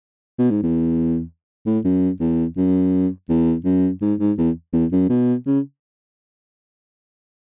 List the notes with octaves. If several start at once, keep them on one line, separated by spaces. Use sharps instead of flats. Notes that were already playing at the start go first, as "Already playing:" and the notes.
B2
G#2
E2
A2
F#2
E2
F#2
E2
F#2
G#2
G#2
E2
E2
F#2
B2
C#3